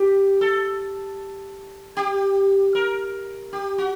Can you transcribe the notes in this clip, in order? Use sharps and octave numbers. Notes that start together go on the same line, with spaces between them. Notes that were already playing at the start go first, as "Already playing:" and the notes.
Already playing: G4
A4
G4
A#4
G4
F#4